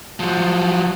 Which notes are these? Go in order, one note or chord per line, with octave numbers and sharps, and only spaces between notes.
F3 F#3